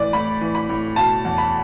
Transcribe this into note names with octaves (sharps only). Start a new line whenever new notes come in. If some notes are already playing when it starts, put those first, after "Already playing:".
Already playing: A2 E3 D5
A2 B5
E3
B5
A2
B2 A5
E2
B5